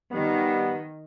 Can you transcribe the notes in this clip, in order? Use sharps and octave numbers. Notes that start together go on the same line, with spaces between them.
D#3 G3 B3